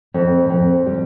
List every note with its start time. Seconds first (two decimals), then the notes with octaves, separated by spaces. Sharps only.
0.14 F2
0.49 F2
0.86 G3